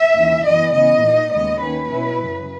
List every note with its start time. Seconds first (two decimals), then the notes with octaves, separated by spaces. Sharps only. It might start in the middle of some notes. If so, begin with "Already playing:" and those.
Already playing: E5
0.15 D#2 C#3 E3
0.44 F#2 E3 B3 D#5
0.73 C#3 E3 B3 D#5
1.02 A#2 A#3 D#4
1.32 D#2 C#3 G#3 B3 D#5
1.62 D#2 D#3 A#3 C#4 B4
1.91 B2 F#3 C#4 E4
2.20 F#2 C#3 F#3